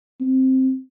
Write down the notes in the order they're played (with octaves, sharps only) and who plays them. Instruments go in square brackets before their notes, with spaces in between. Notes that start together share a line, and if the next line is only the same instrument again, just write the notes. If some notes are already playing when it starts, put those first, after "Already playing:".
[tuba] C4